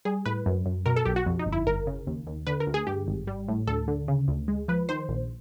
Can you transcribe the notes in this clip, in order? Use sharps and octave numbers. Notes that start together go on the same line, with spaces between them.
G3 G#4
A2 B4
F#2
F#2
B2 A#4
A4
B1 G4
F#4
F2
D#4
G1
E4
G1 A#4
C#3
D#2
D#2
D3 B4
A#4
D2
G#4
G2 G4
G#1
G3
A2
D2 A4
D3
C#3
D2
G#3
F3 B4
D#3 C5
A#1